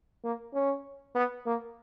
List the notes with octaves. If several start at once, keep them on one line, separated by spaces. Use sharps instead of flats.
A#3
C#4
B3
A#3